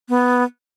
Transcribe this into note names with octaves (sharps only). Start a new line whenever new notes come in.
B3